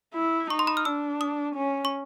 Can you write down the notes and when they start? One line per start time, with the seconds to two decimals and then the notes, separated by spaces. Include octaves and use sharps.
0.14 E4
0.50 D#4 C#6
0.59 C6
0.67 B5
0.77 F6
0.85 D4 E6
1.21 D#6
1.56 C#4
1.85 C#6